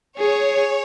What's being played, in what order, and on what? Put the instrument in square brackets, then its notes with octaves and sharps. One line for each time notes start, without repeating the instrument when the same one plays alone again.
[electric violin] G#4 [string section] C#5